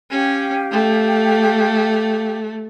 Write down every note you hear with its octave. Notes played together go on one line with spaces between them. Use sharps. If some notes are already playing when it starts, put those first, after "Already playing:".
C#4 G4 F5 G5
A3